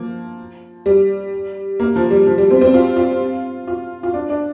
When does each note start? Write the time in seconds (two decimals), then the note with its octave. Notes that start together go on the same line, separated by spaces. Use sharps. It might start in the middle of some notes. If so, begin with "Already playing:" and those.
Already playing: F3 A#3
0.86 G3
1.80 A#3
1.96 F3
2.11 G3
2.27 F3
2.38 G3
2.51 C4
2.61 C4
2.74 F4
2.96 F4
3.67 F4
4.03 F4
4.14 D4
4.29 D4